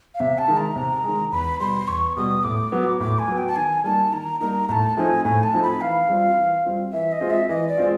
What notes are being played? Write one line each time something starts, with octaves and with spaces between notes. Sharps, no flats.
F5
C3 E5
A5
D#3 G#3
A#5
C3
D#3 G#3
E2 B5
B2 G3 C6
E2 C#6
B2 G3 D#6
A2 D6
F#3 B3
A2 D6
G#5
F#3 B3
G5
A5
D#3 G#5
G3 A#3 D#4 A5
D#3 A#5
G3 A#3 D#4 A#5
A2 A5 A#5
F3 A3 C4 D#4 G#5
A2 G#5
A5
F3 A3 C4 D#4
B5
E3 F5
G3 C4 F4
E3
G3 C4 F4
E3 E5
D#5
G#3 C4 F4
E5
E3 D#5
D5
G#3 C4 F4